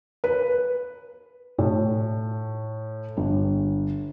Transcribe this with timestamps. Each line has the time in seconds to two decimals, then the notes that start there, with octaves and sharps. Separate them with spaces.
0.24 B4
1.58 A2
3.17 G1